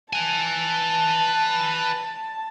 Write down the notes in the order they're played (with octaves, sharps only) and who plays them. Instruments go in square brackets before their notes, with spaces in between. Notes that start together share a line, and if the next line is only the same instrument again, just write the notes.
[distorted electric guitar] B4 G#5 [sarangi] A5